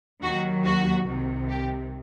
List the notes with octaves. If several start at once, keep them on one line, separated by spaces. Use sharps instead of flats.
D#2 D#3 F#3 F#4
F#4
C2 C3 D#3
G4